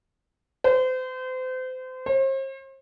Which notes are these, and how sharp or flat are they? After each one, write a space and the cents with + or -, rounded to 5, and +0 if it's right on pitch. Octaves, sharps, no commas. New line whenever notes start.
C5 -35
C5 +40